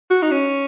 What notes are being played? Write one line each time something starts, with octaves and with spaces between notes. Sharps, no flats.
F#4
D#4
C#4